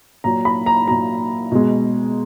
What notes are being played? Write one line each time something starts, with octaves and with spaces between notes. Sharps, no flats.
A#2 F#3 A#5
B5
A#5
A#2 F#3 A#5
B2 G#3